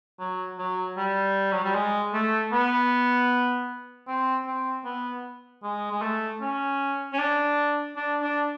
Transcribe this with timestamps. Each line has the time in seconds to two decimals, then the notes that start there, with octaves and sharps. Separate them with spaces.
0.19 F#3
0.59 F#3
0.97 G3
1.52 F#3
1.64 G3
1.74 G#3
2.13 A3
2.52 B3
4.08 C4
4.46 C4
4.85 B3
5.63 G#3
5.91 G#3
6.01 A3
6.41 C#4
7.13 C#4
7.19 D4
7.96 D4
8.22 D4